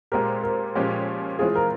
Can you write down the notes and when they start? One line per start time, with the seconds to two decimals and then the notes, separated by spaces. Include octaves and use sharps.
0.12 A#2 G#3 C4 G4 A#4
0.43 A#4
0.75 A#2 F3 G#3 C#4 G4
1.39 E3 G#3 C4 F4 G#4
1.55 A#4